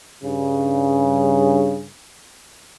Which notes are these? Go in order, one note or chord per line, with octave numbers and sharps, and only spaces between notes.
G2 C#3